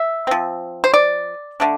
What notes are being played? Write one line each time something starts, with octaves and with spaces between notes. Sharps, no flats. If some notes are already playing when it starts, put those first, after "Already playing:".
Already playing: E5
F3 C4
C5
D5
D3 A3 D4